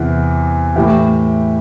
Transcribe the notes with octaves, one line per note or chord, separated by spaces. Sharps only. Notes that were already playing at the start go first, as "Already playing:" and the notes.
Already playing: E2 C3 E3
A2 E3 G4